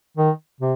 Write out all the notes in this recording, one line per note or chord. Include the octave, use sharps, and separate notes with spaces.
D#3
C3